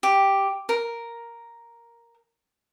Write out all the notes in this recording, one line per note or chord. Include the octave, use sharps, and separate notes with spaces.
G4
A#4